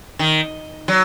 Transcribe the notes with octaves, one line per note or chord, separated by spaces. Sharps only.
D#3
F#3